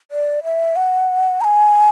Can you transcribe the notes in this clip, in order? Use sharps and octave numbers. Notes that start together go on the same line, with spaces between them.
D5
E5
F#5
A#5
G#5